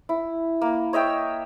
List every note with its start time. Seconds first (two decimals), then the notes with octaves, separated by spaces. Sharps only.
0.09 E4
0.62 A#3
0.93 C#5 D#5 E5 G5